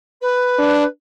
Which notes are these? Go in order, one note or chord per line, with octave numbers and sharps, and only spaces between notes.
B4
D4